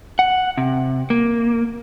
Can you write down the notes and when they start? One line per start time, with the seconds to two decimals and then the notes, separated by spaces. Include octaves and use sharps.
0.19 F#5
0.58 C3
1.10 A#3